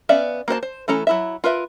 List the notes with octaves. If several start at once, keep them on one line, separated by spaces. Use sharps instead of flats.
B3 C#4 D5 E5 F5
A#3 F#4 C5 A5
C5
E3 A3 C#4 A4 A#5
F#3 E4 E5
F4 A#4 B4 E5